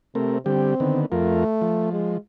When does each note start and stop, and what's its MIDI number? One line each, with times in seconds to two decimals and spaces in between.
0.15 0.38 48
0.15 0.38 57
0.15 0.38 60
0.15 0.38 70
0.46 0.75 50
0.46 0.75 55
0.46 1.01 60
0.46 0.75 67
0.80 1.06 50
0.80 1.06 51
0.80 1.06 59
1.12 1.44 41
1.12 1.92 57
1.12 1.44 65
1.12 1.44 70
1.61 2.18 53
1.93 2.16 56